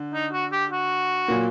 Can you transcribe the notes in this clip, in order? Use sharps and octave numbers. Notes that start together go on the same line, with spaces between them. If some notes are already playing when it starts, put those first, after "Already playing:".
Already playing: D3
D#4
F#4
G4
F#4
A#2 F#3 A#3